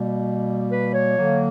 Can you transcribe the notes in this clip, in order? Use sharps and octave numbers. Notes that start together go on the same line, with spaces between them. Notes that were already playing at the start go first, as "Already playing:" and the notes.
Already playing: B2 G3 A#3
B4
C#5
D3 F#3 A#3